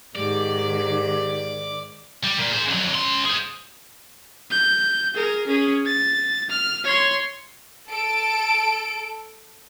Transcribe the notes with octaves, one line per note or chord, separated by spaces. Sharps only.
G#2 D#3 G4 D5
G3
A#2
G#4 C5
F2 F#3
C#3 C6
G#4 C5
G6
G#4 A#4
C#4 G#4
A6
F6
C#5 C6
A4 D7